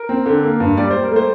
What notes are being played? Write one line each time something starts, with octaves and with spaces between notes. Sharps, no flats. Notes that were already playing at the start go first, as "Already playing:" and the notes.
Already playing: A#4
C4
D3
A#3
G2
G3 D5
G3 C5
A#4
A3 C5